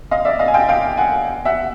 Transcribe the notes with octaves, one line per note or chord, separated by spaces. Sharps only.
D#5 F5
D5 E5
D#5 F5
G#5
F5 G5
F5 G5
F#5 G#5
E5 F#5